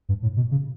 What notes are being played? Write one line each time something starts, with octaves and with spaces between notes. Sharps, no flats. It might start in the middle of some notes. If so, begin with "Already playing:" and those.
G2
A2
B2
C#3